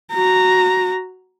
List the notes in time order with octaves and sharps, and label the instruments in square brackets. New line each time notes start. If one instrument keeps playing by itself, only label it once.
[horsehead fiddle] F#4 A#5